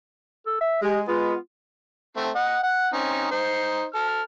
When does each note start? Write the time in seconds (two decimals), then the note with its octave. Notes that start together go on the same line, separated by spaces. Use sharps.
0.46 A4
0.61 E5
0.82 G#3 G4
1.08 G#3 B3 F4
2.17 A3 C4
2.35 D#5 F#5
2.63 F#5
2.93 C4 C#4 D#4
3.31 D#4 C5
3.94 A4 F6